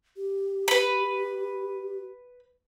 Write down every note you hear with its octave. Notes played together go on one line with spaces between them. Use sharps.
G4
B4 B5